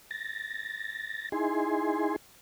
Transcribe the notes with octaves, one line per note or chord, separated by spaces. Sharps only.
A6 A#6
D#4 E4 G#4 G#5 C6